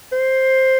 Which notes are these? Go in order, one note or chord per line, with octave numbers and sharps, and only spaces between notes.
C5